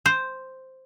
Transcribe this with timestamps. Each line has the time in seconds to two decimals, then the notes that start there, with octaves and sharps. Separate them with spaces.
0.06 C5